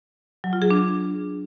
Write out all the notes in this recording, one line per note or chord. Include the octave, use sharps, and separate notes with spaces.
F#3
F4
G#4
D4